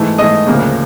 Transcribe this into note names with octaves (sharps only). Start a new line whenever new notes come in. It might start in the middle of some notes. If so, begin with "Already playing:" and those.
Already playing: G#2 E3 A3
G#2 E3 A3 D#5
D2 C#3 F3 A#3